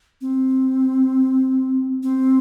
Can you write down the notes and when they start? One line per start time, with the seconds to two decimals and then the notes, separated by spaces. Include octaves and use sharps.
0.21 C4
2.03 C4